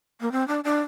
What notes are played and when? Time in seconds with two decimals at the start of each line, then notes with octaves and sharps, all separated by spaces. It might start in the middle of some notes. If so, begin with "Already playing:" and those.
0.21 A#3
0.32 C4
0.48 D4
0.64 D4